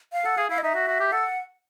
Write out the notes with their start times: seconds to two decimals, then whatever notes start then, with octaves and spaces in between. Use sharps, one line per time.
0.13 F5
0.25 A4 F#5
0.37 G#4 F5
0.50 E4 F5
0.58 D#5
0.63 D#4 E5
0.75 F#4
0.88 F#4
1.00 G4
1.12 A4 F#5